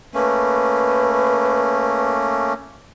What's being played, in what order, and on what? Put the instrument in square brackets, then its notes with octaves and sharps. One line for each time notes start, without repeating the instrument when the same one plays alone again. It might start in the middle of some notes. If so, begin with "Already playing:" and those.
[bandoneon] A3 A#3 C#4 [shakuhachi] B4